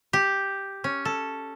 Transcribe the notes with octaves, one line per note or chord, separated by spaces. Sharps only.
G4
C#4
A4